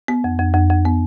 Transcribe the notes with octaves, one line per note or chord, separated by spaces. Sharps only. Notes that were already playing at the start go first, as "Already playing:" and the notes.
B3
F2
F2
F2
F2
B3